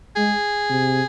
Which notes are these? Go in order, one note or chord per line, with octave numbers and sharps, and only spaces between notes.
G#3 G#4
C3